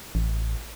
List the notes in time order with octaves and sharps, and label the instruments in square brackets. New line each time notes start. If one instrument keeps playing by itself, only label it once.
[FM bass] A1